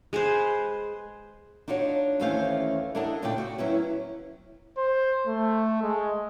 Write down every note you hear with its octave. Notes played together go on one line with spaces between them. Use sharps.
G#3 G#4 B4 C5
D4 D#4 F4 F#4 C#5
D#2 E3 A3 C#4 C5 F5
D4 E4 A4 A#4 D#5 F#5
A#2 C#3 A3 F4 D5 G5
F#4
F#3 C#4 E4 B4
C5
A3
G#3